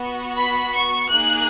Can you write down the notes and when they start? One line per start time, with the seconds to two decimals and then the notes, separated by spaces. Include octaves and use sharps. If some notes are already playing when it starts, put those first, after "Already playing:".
Already playing: B3 F#4
0.37 B5
0.75 C#6
1.12 A#3 D#4 G#4 F#6